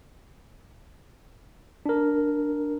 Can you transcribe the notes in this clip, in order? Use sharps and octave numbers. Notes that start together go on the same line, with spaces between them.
D4 A#4